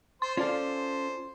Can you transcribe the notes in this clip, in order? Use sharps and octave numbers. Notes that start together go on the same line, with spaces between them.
C5 C6
C#4 F4 A4 C5 D5 F5